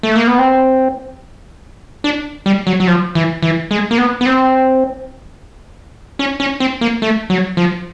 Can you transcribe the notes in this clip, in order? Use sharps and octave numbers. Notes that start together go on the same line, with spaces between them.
A3
A#3
B3
C4
D4
G3
F#3
F#3
F3
E3
E3
G#3
A#3
B3
B3
C4
C#4
C#4
C4
A#3
A3
F#3
F3